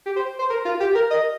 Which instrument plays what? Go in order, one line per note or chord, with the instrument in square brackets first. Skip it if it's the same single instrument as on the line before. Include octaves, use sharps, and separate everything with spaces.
[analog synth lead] G4
C5
C5
A#4
F4
G4
A#4
D#5